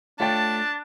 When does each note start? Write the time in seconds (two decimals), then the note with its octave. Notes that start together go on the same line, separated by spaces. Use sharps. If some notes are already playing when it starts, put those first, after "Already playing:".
0.20 A3 D4 F4 C#5 G5 A5